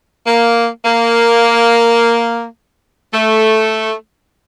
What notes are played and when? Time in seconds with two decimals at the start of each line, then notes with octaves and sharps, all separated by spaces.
0.27 A#3
0.84 A#3
3.13 A3